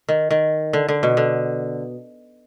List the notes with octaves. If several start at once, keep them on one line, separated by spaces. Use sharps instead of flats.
D#3
D#3
D3
D3
B2
D3